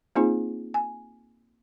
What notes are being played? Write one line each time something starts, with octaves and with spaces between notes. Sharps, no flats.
A#3 C4 D#4 F4 G#4 C5
G#5